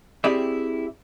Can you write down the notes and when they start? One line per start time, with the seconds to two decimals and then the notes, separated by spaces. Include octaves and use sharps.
0.24 C4 E4 G4 G#4 D5 E5